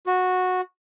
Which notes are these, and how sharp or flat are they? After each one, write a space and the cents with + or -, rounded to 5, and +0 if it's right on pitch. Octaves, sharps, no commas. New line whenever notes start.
F#4 -10